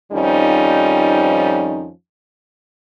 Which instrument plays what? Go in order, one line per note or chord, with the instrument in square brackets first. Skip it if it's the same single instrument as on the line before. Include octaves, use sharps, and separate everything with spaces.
[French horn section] F2 D#3 F3 G3 C#4 D#4